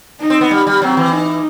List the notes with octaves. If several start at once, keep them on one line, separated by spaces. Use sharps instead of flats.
D#4
C4
B3
G3
G3
F#3 C4
E3
D#4